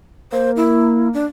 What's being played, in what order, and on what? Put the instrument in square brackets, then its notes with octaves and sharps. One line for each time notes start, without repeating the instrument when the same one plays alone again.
[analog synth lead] A#3 [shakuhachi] C5
[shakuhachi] E4
D4